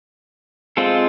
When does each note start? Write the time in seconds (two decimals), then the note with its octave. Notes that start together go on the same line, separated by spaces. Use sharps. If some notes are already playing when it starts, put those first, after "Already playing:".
0.77 G#3 C4 F4 A4 C5